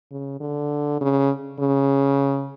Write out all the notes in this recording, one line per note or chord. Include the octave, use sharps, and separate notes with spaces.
C#3
D3
C#3
C#3